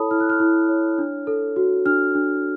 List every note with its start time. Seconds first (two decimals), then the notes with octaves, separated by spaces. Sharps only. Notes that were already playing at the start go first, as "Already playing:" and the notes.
Already playing: E4 A4 C#5 A5 B5 D#6
0.11 E4 F6
0.20 F#6
0.29 F6
0.40 E4
0.69 C#5
0.98 D4
1.27 A4
1.56 F#4
1.86 D4 F6
2.15 D4